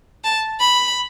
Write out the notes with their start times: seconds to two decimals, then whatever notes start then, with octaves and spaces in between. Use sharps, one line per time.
0.24 A5
0.60 B5